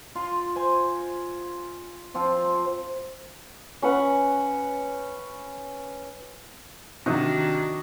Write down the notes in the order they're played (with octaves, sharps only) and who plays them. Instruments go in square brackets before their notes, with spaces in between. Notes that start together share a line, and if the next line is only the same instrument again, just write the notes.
[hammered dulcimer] F4 C6
C5 G#5
F3 C4 F4
[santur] C#4 B4 F#5
[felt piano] C3 [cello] D#3 D4 [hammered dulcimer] F#4 D#5